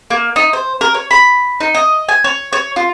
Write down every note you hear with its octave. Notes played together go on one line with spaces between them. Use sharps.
A#3
D#4
C5
A#4
C#5
B5
D#4
D#5
G#5
C#5
C#5
F4